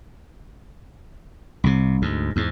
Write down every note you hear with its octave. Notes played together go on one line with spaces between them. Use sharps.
C2 C3
D2 G#2
E2 G#2